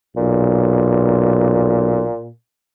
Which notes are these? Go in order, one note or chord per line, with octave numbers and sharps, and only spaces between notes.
B1 A#2